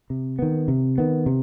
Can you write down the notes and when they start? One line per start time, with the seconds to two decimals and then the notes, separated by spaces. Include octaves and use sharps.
0.10 C3
0.39 D#3 B3
0.68 C3
0.98 D#3 B3
1.26 C3